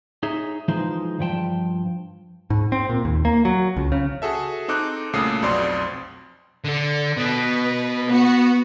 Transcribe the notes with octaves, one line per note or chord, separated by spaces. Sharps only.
D#4 G#4 C#5 E5
E3 F3 G#3 D#4 C5
G2 F3 G5 A5
G#2
C4
A#2
D#2
A#3
F#3
C#2
C#3
F#4 G#4 A4 E5
C4 D#4 A4 D6 F#6
C2 A#2 C#3 A3 D#6 C7
B1 F2 B2 C4 D5 C6
D3 A4
B2 B4
B3 F#4